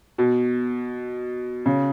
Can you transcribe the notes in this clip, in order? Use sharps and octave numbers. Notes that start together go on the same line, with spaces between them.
B2
C#3